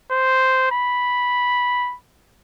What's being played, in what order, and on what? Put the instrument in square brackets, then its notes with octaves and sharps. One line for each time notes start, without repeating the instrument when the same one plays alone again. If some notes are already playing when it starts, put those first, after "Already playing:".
[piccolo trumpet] C5
B5